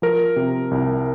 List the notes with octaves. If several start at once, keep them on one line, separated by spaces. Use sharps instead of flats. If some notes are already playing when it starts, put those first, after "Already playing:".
F3 A#4
C3
C2